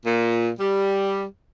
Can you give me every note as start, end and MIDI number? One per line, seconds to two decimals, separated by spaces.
0.05 0.50 46
0.60 1.24 55